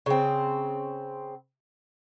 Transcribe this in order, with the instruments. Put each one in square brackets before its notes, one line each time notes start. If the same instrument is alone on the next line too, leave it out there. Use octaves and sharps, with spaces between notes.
[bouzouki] C#3 C4